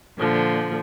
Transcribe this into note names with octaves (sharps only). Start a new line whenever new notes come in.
A#2 D3 F3